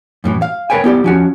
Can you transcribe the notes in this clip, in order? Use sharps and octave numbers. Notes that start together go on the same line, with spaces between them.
F#2 A2 E3
F5
A#4 B4 C#5 G5 G#5
B3 E4 G4 D5
F3 C#4 F#4